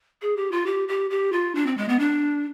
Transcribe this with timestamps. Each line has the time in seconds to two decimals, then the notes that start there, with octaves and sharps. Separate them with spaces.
0.22 G#4
0.37 G4
0.52 F4
0.66 G4
0.88 G4
1.10 G4
1.32 F4
1.55 D4
1.66 C4
1.77 G#3
1.89 B3
1.99 D4